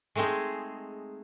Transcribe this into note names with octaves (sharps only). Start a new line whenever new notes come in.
G#3 A3 C4 D#4 G#4